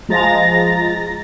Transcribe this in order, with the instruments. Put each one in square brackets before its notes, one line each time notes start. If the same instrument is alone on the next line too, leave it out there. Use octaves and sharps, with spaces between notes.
[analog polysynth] F3 G#3 A#5 A6 A#6